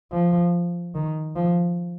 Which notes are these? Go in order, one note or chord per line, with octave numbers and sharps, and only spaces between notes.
F3
D#3
F3